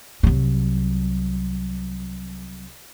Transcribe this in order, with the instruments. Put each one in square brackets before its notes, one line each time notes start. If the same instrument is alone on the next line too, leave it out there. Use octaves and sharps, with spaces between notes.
[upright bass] C2 F#3